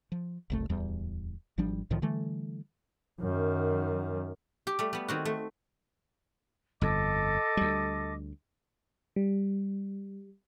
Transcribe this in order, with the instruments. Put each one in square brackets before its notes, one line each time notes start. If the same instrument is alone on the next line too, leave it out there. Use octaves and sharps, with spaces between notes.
[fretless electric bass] F3
F#1 C2 A3
D1 E2 G3
G#1 F3 G3 D4
C2 A2 D#3 F3
D3 E3 G3 A3
[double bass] F#2 D#3
[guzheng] G4
G3 A3
G3 B3
D#3 C4 F#4
A3
[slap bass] G1 F2 [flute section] A4 D#5 D6
[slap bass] D2 G3
[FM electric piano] G3